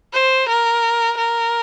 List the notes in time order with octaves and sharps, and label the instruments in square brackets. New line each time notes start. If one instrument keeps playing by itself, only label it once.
[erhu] C5
A#4
A#4